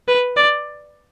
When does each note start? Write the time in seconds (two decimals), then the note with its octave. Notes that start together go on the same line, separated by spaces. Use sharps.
0.08 B4
0.37 D5